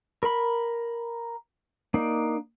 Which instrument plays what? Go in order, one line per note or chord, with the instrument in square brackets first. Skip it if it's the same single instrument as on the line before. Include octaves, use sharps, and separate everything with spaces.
[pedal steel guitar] A#4 B5
A#3 D4 D#4